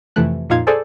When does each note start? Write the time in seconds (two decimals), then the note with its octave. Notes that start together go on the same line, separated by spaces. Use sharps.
0.16 F2 C3 E3 A3 F#6
0.49 F2 A#2 D#4 F4 F5 G#6
0.67 G#4 A4 C5 D5 G#5